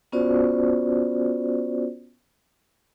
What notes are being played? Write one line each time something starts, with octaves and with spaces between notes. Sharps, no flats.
B3 C#4 F4 F#4 C5 D5